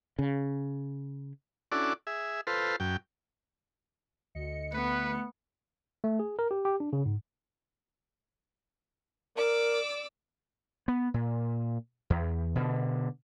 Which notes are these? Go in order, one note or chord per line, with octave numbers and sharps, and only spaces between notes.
C#3
C#4 D4 E4 F#4 A4 D5
G#4 E5
F4 A4 B4 C5
F#2 G5
D2 D#5 C#7
A3 B3 B4
A3
G#4
A#4
G4
G4
D4
C#3
G#2
A#4 D5 D6 E6
B3
A#2
E2
B2 D3